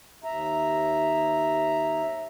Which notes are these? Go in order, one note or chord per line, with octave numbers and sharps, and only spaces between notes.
D#2 E5 A#5